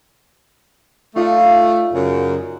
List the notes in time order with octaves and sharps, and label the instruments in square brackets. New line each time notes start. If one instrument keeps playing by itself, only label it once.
[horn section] A3 [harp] D#4 F4 D5
[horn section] F#2 C#3